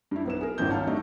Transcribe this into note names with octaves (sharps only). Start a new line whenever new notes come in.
G2 E4
B1 B3 E7
G#4 A#4
G#1 C#2 G2 F3 E4 G6
C#5 F5 A5 A#5 F6
F#3 G3 A3 D4 D#4